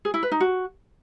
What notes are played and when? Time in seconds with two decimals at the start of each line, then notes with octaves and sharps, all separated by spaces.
0.05 G#4
0.14 E4
0.23 B4
0.32 D#4
0.40 F#4